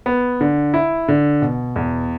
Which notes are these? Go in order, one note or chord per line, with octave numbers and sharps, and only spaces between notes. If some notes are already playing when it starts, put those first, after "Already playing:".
B3
D3
E4
D3
B2
E2